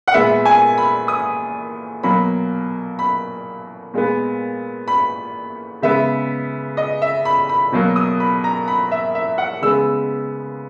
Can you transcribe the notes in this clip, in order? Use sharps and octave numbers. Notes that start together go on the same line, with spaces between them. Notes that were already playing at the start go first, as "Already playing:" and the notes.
F#5
A#2 G#3 B3 E5
G#5
B5
D#6
B2 F#3 A#3 B5
B5
A#2 G#3 B3
B5
C#3 G#3 B3 E5
D#5
E5
B5
B5
B2 F#3 A#3
D#6
B5
A#5
B5
E5
E5
F#5
C#3 G#3 B3 E6